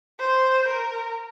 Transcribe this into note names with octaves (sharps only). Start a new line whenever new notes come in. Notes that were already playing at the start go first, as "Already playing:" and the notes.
C5
A#4